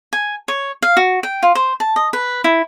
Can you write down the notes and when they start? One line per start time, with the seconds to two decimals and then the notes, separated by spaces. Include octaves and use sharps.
0.13 G#5
0.48 C#5
0.82 F5
0.97 F#4
1.23 G5
1.43 F4
1.55 C5
1.80 A5
1.96 D#5
2.13 B4
2.44 E4